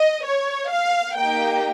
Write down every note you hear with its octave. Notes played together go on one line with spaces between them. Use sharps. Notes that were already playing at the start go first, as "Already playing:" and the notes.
Already playing: D#5
C#5
F5
A#3 D#4 G4 G5